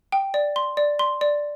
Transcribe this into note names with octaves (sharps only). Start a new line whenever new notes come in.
G5
D5
C6
D5
C6
D5